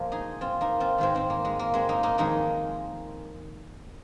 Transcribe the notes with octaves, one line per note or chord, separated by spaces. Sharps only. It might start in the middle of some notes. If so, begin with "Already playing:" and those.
Already playing: A#2 F3 G#3 A#3
D#4 G#4
C4 F4
A#3 D#4
C4 F4
G#2 D#3 G#3 C4 F4
G#3 C4
A#3
G#3
A#3
G#3 C4
A#3 D#4
A#3 D#4
F2 D#3 G#3 A#3 D#4